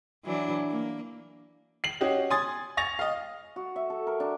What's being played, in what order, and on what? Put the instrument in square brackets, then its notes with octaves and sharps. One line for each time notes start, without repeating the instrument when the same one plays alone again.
[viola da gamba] E3 F#3 D4
A#3
[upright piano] C7 F#7
C#4 F#4 G4 D#5
G#5 C6 D#6 A6
G#5 C#6 A6 A#6 F7
D#5 F5
[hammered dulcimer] F#4
E5
A4
A#4
D4